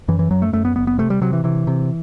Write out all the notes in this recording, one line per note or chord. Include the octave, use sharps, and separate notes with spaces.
F#2 E3
E3
F#2 F#3
A3
F#2 A3
B3
F#1 B3
B3
C3 A3
G3
C3 F#3
E3
C3 E3
C3